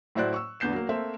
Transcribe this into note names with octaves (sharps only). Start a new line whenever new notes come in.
A2 F#3 E4 C5 D5 F#6
C#6 E6
E2 D3 B3 G6 C7 E7
F#3 A#3
A3 A#3 C4 C5 E5